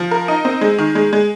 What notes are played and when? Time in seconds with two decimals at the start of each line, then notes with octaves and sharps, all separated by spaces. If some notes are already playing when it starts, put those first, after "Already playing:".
Already playing: F3
0.11 A#4
0.28 D#4
0.45 C4
0.61 G#3
0.78 D#3
0.95 G#3
1.13 G#3